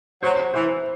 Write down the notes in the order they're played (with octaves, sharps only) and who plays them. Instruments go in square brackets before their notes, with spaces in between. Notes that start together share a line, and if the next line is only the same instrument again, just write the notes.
[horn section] F#3 [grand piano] C5
[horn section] E3 [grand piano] C5